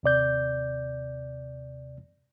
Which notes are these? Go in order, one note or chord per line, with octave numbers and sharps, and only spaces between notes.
D#2 C3 D5 G6